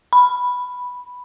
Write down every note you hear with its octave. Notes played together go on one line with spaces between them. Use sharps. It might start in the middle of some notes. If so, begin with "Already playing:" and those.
B5